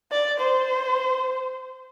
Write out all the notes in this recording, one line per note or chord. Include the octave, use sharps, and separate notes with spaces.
D5
C5